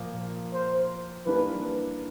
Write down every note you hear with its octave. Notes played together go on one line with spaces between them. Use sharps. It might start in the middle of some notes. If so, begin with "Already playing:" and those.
Already playing: A#2 F3 A#3
C5
E3 G3 A#3 D4 B4